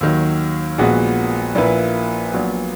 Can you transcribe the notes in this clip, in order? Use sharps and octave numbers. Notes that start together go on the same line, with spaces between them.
D#2 D#3 F#3
A#1 A#2 G#3 B3 F#4
A#1 A#2 A#3 E4 B4
A#1 A#2 F#3 B3